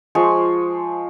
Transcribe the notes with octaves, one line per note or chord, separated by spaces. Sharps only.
F3 G#3 C5 C#6